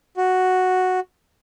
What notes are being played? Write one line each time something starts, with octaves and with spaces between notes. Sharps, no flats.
F#4